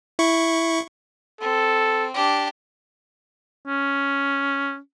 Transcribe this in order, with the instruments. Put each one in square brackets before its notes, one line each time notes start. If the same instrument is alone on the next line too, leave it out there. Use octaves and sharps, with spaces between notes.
[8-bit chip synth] E4 C#6
[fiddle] C4 [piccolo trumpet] A4
[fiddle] D4 G4
[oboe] C#4